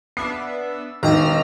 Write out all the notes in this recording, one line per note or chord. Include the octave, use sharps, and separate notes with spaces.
B3 D4 E5 C7
E1 D#3 A#5 E6 F6